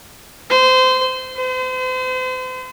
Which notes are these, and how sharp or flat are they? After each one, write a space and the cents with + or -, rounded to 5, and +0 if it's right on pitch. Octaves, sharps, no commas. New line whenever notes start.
C5 -25
C5 -40